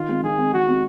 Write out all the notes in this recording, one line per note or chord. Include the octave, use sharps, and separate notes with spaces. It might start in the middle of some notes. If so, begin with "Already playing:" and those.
Already playing: D#3 F4
G#3 C4
D#3 G#4
G#3 C4
D#3 F#4
G#3 C4